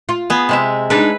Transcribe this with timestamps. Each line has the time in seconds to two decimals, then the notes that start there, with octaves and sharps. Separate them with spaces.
0.09 F4
0.30 B3 G#4
0.49 C3 G#3 E5
0.90 G#3 D4 D#4 B4